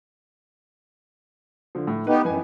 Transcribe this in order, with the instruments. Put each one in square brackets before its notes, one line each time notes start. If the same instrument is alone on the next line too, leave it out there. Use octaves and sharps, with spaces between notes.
[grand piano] D3 F3
A2
[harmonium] B3 D#4 G4 [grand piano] B4
[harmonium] F#2 [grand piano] E3 B4 G#5